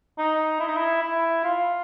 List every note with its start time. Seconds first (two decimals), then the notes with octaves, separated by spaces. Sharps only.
0.18 D#4
0.60 E4
0.68 D#4
0.77 E4
1.02 E4
1.44 F4